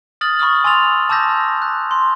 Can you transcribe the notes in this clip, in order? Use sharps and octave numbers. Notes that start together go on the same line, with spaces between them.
D#6 F6 A6 F#7
B5 C#6 D#6 F6
G#5 C6 E6 A6 F7
A5 D6 E6 G6 A#6
F#6
C6